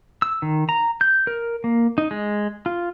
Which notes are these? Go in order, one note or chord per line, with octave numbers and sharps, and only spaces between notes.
E6
D#3
A#5
G6
A#4
A#3
D#4
G#3
F4